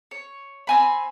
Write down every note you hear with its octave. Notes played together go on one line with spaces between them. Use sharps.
C#5
C4 G#5 B5